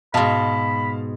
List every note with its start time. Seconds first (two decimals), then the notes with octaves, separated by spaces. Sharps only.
0.14 G#2 B2 F5 A5 B5